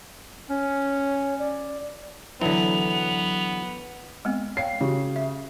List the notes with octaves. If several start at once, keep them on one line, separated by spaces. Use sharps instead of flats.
C#4 C#5
D5
D3 E3 F#3 B3 F7
G#3 B3 C4
C#5 F5 G5 C7
C#3 F#4 G4
E5